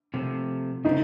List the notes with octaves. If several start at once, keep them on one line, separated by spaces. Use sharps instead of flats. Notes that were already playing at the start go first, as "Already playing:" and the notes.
C3 F3 A3
C#3 A3 C4 D#4